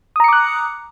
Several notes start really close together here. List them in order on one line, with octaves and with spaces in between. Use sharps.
D#6 A#5 C#7 D6 F#6